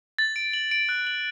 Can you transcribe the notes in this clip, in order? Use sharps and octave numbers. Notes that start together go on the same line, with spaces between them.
A6
D7
F#7
D7
F#6
F#7